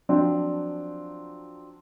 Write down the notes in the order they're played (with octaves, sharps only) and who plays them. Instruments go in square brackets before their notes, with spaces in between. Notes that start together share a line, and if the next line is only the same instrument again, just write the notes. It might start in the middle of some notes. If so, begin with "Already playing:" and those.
[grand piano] F3 F#3 C4 D4 F4